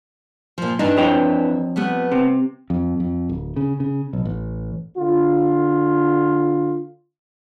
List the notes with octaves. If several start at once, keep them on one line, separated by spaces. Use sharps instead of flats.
A#2 F3
G2 E3 D4 D#4
F2 C#5 G5
G3 A3 B3
C3
F2
F2
D1
C#3
C#3
B1
A1
D3 F4